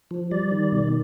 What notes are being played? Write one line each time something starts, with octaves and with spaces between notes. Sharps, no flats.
F3
G3 D5
D#3
B2